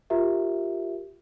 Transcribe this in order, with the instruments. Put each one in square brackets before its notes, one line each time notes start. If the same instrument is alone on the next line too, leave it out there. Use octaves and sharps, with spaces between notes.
[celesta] F4 G4 A#4 E5